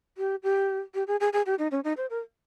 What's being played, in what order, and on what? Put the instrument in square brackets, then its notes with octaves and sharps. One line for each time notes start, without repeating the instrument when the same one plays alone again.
[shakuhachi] G4
G4
G4
G#4
G#4
G#4
G4
D#4
C#4
D#4
C5
A#4